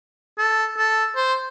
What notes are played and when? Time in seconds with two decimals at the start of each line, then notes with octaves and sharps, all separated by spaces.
0.38 A4
0.77 A4
1.16 C5